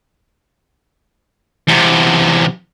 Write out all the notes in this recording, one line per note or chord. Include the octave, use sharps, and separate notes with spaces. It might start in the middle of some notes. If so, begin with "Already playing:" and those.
E2 C3